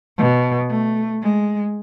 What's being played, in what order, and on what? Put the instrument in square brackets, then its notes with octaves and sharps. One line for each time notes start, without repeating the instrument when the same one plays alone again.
[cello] B2
A3
G#3